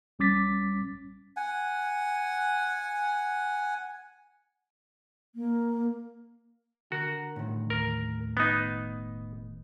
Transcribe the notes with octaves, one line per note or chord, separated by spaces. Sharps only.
A#1 G3 C#4 D6 A6 B6
F#5 G#5
A#3
D3 F#4 A#4
A2 D#3
D#2 A#4
E1 B3 D#4